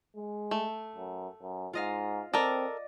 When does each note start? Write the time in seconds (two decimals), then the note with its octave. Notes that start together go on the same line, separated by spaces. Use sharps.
0.16 G#3
0.51 A3
0.96 F#2
1.42 F#2
1.73 G#2 F4 D#5 F5
2.33 C4 A4 A#4 D5 D#5